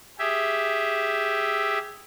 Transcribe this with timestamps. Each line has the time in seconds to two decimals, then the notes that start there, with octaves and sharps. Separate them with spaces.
0.19 G4 G#4 E5